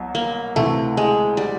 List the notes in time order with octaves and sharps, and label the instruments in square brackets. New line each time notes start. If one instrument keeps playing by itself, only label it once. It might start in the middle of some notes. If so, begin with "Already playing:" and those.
Already playing: [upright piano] C2 B2 F#3
[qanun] A#3
[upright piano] D2 C3 E3 [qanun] A3
[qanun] G#3
G3